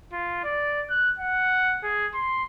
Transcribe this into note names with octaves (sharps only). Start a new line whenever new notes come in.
F4
D5
F#6
F#5
G#4
C6